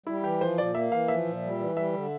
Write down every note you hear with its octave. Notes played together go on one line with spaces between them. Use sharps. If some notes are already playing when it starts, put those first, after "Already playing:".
G3 E4
E3 G4
F3 C5
A#2 D5
A#3 E5
E3 F5
F3 E5
A#2
G3
E3
G3 E5
D3